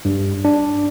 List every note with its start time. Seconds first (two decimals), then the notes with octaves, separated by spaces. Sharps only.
0.05 G2
0.45 D4